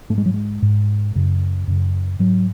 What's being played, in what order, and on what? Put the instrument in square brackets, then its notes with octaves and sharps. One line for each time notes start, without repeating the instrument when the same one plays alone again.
[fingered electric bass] G#2 A3
G#3
F#3
G#3
G#2
F#2 C#3
F#2 C#3
G#2 F#3